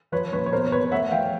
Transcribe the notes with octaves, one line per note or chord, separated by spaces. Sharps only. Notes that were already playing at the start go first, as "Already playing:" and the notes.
F3 B4 C#5
A#2 B4 C#5
C#5
B2 A#4 C5
E2 B4 C#5
A3 E5 F#5
F3 F5 G5